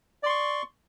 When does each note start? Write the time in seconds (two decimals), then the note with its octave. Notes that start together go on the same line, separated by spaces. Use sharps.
0.23 D5
0.26 C6
0.29 C#6